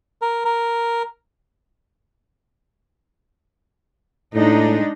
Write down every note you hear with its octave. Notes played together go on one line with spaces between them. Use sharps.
A#4
A#4
A2 G#3 D4 D#4